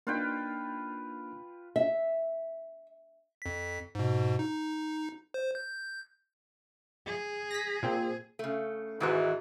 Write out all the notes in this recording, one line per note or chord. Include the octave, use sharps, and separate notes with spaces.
A#3 D4 D#4 F4 B4 G5
E5
F2 B6
G#2 B2
D#4
C5
G6
G#4
A#6 B6
A#2 C4
C#3 A3
G#2 D#3 E3 G#3 F#4